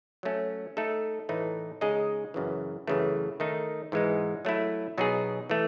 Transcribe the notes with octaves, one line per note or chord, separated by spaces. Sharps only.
F#3 A3 C#4
A3 D#4 A4
A2 E3 A3 D#4
C#3 G#3 D#4 G#4 D#5
F#2 C#3 E3
F#2 C#3 E3 A3
D#3 A3 D#4
G#2 E3 G#3 D#4
F#3 A3 E4
B2 F#3 B3 D#4 G#4
E3 A3